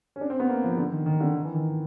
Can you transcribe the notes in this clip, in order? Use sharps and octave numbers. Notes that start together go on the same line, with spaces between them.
C#4
D4
C4
B3
A#3
F3
D3
D#3
D#3
D3
D#3
E3
D#3